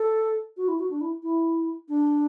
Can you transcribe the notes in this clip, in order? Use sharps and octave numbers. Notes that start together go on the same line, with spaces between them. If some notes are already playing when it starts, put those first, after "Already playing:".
Already playing: A4
F#4
E4
F#4
D4
E4
E4
D4